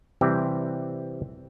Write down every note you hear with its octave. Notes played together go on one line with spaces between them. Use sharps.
C3 E3 G3 C4 G4